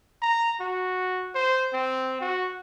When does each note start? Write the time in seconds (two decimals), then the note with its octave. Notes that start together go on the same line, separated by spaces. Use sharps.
0.22 A#5
0.60 F#4
1.35 C5
1.73 C4
2.21 F#4